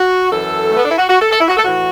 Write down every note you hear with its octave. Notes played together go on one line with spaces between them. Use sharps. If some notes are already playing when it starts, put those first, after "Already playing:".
Already playing: F#4
F#2 E3 A4
A3
B3
D4
E4
F#4
F#4
A4
A4
E4
F#4
A4
A2 E3 F#4